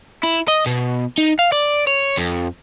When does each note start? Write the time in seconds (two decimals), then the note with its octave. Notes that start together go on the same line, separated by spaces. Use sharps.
0.23 E4
0.48 D#5
0.66 B2
1.18 D#4
1.39 F5
1.52 D5
1.87 C#5
2.18 F2